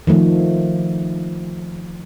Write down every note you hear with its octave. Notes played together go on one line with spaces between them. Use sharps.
D#3 F3 A3